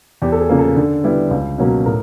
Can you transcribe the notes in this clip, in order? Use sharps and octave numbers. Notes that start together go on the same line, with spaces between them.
E2 G4
A4
G#4
C#3 F3 A#3
A4
D3
G3 B3 E4
C#2
B2 F#3 A#3 C#4
A2 A#4